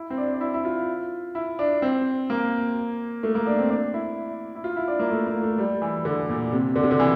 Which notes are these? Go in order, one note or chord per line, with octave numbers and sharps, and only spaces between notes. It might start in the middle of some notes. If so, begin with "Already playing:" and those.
Already playing: E4
C4
D4
D4
E4
E4
F4
E4
D4
C4
A#3
A3
A#3
D4
C4
D4
E4
E4
F4
E4
D4
A#3
A3
A#3
A3
G3
E3
D3
A#2
C3
D3
C3
D3
E3